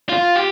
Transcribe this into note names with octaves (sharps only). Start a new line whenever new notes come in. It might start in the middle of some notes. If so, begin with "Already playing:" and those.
F4
G4